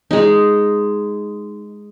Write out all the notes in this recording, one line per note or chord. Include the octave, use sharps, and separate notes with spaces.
G#3 D#4